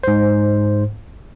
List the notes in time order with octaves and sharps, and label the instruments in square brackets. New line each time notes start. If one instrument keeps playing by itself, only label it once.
[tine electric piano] G#2 C5